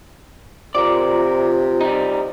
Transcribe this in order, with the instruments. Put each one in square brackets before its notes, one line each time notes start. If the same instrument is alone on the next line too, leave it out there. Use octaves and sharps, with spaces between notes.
[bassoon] C3 [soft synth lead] F4 [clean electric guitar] A#4 D5
[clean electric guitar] G3 D#4